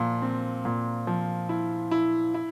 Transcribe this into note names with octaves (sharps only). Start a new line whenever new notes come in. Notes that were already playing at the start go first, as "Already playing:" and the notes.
Already playing: A#2 F3
C4
A#2
F3
E4
E4
E4